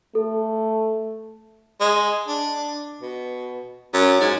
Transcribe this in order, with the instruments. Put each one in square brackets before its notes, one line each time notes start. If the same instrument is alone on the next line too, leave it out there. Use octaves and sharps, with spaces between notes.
[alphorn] A3 [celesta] A4
[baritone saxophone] G#3
D4
B2
F#2
G#2